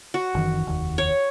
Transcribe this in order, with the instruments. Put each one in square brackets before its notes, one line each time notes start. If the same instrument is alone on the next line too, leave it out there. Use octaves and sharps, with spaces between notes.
[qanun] F#4
[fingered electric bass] F#1 D#3 E3
F1 D#2
[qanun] C#5